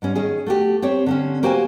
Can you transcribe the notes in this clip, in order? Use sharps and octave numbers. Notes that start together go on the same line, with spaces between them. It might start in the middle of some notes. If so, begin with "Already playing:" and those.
G#2 G3 C#4
D#3 C#4 G#4
A3 F#4 G4
C4 G4 C5 C#5
D3 C4 C#4
A#3 F#4 G4 C5 G5 G#5